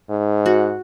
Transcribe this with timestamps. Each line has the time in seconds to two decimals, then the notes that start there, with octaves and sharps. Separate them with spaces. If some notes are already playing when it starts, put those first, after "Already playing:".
0.10 G#2
0.46 F#4